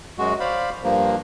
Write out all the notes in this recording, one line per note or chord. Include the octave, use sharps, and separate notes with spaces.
F#2 G#3 F#4
C5 D5 F5 B5
G2 F3 A#3